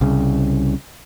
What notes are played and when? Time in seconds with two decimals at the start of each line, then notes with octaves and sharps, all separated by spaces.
0.01 C2 C#3